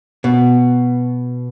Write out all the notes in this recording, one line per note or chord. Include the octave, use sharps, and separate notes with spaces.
B2